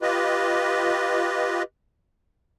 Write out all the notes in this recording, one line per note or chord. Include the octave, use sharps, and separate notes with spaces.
F4 G4 B4 D#5